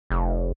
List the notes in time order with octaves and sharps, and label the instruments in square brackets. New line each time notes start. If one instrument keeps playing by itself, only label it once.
[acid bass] F1